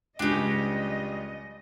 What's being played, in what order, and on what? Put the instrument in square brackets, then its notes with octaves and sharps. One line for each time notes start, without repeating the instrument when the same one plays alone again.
[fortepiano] C#2 C#3 [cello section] G3 D#5 [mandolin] D4 G4